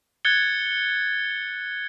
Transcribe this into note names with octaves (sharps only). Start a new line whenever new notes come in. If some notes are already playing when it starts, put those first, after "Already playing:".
F#6 G#6 A6 C#7 G7